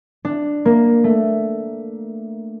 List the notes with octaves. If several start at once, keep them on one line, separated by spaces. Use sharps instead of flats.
D4
A#3
A3